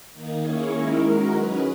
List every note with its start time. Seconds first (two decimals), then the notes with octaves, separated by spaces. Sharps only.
0.12 D#3 A#3 D#4
0.42 A#3 C#4 E4 G#4 C#5
0.72 D#3 G#3 C#4 E4 A#4
1.01 G#3 D#4 F#4 A#4
1.31 F#3 C#4 G#4 B4